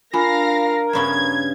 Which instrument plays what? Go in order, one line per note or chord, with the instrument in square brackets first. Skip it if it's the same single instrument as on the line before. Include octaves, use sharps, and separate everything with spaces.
[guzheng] D4 [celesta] F4 G#5 B5 [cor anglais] A#4 [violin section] F5 A#6
[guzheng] G2 C#3 B3 [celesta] A#5 B5 C#6 [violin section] G#6